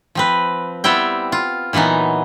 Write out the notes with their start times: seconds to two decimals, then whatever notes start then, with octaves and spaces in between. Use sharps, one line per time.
0.15 F3 C4 B4
0.84 G3 B3 C4 E4 E5 G5
1.32 F4
1.73 A#2 E3 F#3 B3 D#4